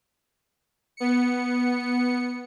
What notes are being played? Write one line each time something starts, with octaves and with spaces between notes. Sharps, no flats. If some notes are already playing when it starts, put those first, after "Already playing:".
B3 C#7